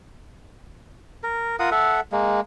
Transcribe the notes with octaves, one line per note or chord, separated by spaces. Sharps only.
A#4
F4 A#4 F#5 D#6
A4 E5 F#5
G#3 A#3